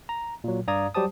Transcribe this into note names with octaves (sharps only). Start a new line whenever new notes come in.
A#5
A#2 F#3
G2 D5 F5 A#5 D#6 G#6
F#3 G3 G4 C5 A5 D#6